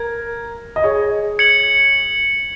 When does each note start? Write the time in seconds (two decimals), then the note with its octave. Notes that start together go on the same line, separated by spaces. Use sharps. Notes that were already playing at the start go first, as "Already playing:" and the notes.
Already playing: A#4 G#6
0.76 D#5
0.84 G#4 C#5
1.39 G#6 C#7 F#7